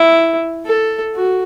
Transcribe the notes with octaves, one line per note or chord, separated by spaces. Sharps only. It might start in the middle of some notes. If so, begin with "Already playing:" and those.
Already playing: E4
A4
F#4